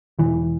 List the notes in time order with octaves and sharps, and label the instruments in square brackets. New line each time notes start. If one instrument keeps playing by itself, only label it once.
[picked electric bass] E1 E3